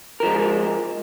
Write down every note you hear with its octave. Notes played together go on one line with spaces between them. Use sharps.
F3 G#3 A#4